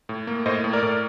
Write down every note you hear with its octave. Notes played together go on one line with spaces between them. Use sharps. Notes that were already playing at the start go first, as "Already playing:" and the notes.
A2
A#3
A2 C5 D#5
A2
A#4 D5
A2